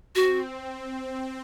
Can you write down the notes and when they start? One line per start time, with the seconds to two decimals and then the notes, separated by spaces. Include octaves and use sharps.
0.15 C4 F#4